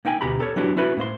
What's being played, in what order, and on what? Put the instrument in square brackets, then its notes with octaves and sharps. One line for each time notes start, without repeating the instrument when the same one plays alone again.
[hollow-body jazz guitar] A#3 D#4 G5 G#5
D2 B2 G4 A#5 B5
G4 A4 B4 C#5
F#3 B3 D4 E4 F#4 G4
C#4 E4 F#4 B4 B5
A2 A#3 C5 C6